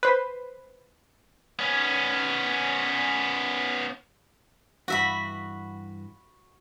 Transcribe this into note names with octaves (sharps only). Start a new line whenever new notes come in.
B4 C5
B3 C#4
G2 E3 F#4 E5 B5